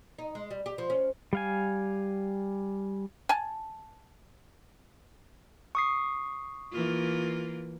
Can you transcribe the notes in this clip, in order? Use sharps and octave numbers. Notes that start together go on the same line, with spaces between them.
D#4
G#3
G3
G4
F3
C#4
G3 F5 G#5
G#5 A5
C#6 D#6 C7
E3 A#3 F4